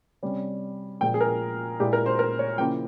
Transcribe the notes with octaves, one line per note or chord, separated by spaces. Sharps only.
C3 G3 C#4
A#2 F3 G#3 G5
G#4
A#4
A#2 G#3 E4 G4
A#4
C5
A#4
C#5
C#3 F3 A#3 E4 G5